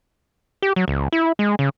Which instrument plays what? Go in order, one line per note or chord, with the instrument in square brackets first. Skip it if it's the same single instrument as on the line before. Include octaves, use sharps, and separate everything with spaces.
[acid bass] G4
F#3
C#2
E4
G#3
C#3